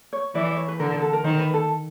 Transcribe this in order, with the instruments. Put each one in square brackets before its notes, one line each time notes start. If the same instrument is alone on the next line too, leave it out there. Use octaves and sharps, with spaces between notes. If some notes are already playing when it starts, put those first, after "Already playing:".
[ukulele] C#5
[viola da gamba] E3 [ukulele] D5
[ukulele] D5
C#5
B4
[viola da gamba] D3 [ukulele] A#4
[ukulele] A#4
A4
A#4
[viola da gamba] D#3 [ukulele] C5
[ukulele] B4
A4